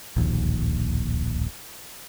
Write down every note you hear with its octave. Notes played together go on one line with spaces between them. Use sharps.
D1 A#1 D#2